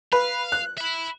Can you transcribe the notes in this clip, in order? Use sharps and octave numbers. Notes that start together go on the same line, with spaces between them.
B4 F5
F#6
E5 B5